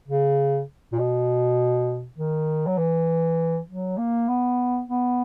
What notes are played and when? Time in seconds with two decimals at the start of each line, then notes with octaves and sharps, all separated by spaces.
0.08 C#3
0.92 A#2
0.99 B2
2.18 D#3
2.67 F#3
2.78 E3
3.68 F#3
3.98 A#3
4.28 B3
4.88 B3